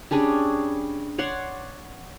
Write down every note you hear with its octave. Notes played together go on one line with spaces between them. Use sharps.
G3 C#4 D4 G#4
C#5 D5 F#5 C6